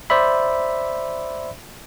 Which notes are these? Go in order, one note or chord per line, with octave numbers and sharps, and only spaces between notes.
C5 D5 E5 B5